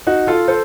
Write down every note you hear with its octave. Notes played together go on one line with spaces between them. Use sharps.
D#4 F#4
F4 A4
A4 C5